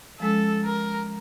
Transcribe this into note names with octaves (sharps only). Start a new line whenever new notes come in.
F3 G#3 C#4 A4
A#4